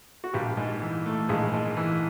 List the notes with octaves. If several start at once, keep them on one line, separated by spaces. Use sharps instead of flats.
F#4
A#1 G3 G4
G#2
E3
A3
A#1 G#3 G#4
G#2
E3